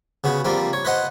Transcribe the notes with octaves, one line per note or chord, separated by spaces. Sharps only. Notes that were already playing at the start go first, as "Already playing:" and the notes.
C#3 B3 F#4
F3 G3 A#3 C4
C#5
B4 C5 D#5 F#5